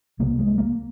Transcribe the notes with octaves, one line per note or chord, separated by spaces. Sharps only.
C2 C3 A#3
G#3
A#3